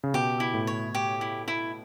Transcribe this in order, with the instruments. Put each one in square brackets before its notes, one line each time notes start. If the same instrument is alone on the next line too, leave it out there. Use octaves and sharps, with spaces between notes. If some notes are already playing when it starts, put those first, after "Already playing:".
[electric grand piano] C#3
[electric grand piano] B2 [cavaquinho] G4
[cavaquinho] E4
[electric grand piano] A2
[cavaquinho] C#5
G4
E4
E4